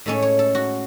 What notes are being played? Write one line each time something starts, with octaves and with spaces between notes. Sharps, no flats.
A2 G#3 C#4 A4
C#5
A4
F#4